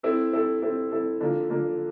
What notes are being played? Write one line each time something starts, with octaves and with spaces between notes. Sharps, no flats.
C4 E4 A4
C4 E4 A4
C4 E4 A4
C4 E4 A4
D3 F3 A#3
D3 F3 A#3